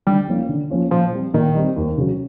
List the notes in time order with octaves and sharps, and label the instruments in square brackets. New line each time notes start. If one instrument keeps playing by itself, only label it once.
[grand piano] D3 [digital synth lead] G3
[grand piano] F3 A#3 C#4 F4
D3
F3 A#3 C#4 F4
[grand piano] A#2 [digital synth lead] F3
[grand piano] G3 C4
[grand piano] A#2 [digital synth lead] D#3
[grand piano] G3 C4
D#2
C#3 F#3